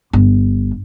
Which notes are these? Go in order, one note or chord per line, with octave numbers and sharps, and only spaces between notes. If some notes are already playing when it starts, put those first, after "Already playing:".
G1